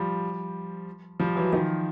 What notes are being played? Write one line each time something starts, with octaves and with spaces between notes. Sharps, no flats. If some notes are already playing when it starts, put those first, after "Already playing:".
Already playing: F3 G3
F3 G3
E3 F#3
D#3 F3